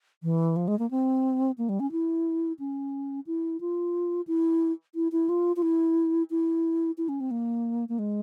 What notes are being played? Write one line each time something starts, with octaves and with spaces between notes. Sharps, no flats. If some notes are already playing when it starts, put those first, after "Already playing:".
E3
F3
G#3
A#3
C4
A#3
G3
C#4
E4
C#4
E4
F4
E4
E4
E4
F4
F4
E4
E4
E4
C#4
C4
A#3
A#3
G#3